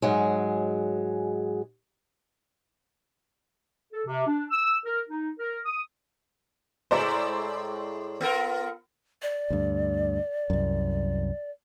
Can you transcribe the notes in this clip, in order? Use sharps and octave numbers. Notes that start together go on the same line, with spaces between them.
G#2 F#3 G#3
A4
C3
D4
E6
A#4
D#4
A#4
D#6
A2 G#3 E4 C5 D5 A#5
B3 F4 A#4
D5
D2 G2
C2 F#2